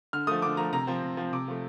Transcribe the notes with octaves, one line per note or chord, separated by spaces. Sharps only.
D3 F6
F3 A3 D#6
D3 D6
F3 A3 A#5
C3 A#5
F3 C4
C3
F3 C4
C3 D6
F3 A3